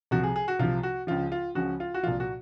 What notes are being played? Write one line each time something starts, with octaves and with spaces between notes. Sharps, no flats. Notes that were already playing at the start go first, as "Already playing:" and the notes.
C2 C3 F3 F#4
G#4
G#4
F#4
C2 C3 F3 F4
F#4
C#2 C#3 F3 F4
F4
C#2 C#3 F3 F#4
F4
F#4
C2 A#2 F3 F4
F#4